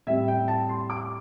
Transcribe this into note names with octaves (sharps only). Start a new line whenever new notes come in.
A2 G3 C4 E5
G5
A5
C6
D6